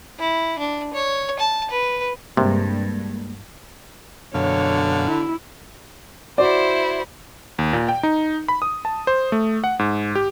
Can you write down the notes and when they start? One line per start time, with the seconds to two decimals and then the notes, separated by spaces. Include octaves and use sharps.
0.19 E4
0.59 D4
0.93 C#5
1.39 A5
1.70 B4
2.37 G2 C3 G#3 A#3
4.34 F#2 B2 D3 C#5 F5
5.07 E4
6.38 E4 F#4 C5 D5
7.59 D#2
7.73 A#2
7.88 G5
8.03 D#4
8.48 B5
8.62 D#6
8.85 A5
9.07 C5
9.32 A3
9.64 F#5
9.79 G#2
10.15 G4